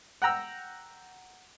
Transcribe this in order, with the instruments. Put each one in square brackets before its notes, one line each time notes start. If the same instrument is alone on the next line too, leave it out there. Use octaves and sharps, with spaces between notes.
[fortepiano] F#5 G5 A#5 E6